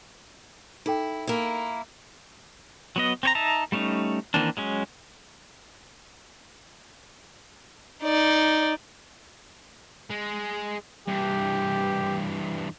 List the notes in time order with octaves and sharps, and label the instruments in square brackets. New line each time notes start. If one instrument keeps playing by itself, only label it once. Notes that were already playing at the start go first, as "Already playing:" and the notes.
[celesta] D#4 A4 G5 [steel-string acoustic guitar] E4
[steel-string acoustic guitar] A#3 E4
[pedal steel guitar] F#3 B3 D#5
C4 C#5 A#5
D#4 E5 A5 A#5
G3 A3 C#4 D#4
D#3 E3 A#3 C4 D4
F#3 G#3 C#4
[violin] D#4 D5
[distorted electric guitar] G#3
[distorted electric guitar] G2 E3 [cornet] G4